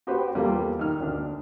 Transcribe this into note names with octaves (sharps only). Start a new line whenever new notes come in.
F#4 G4 B4 C5 G5
E2 G3 A#3 F4 A4 G5
D#3 F6
D2 D4